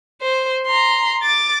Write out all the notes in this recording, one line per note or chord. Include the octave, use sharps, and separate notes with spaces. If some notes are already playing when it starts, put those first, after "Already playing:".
C5
A#5 C6
D6 A6